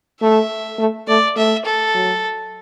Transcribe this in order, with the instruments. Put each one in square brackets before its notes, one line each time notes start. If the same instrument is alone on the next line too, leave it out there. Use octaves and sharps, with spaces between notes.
[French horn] A3 [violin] E5
[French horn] A3
[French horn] A3 [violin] D5
[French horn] A3 [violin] E5
[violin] A4
[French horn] F#3